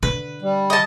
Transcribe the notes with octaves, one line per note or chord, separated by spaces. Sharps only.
D3 B4
G3
D#5 A5